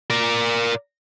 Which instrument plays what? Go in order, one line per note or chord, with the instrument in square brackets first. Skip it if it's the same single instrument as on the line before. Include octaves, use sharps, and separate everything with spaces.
[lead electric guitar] A#4 D5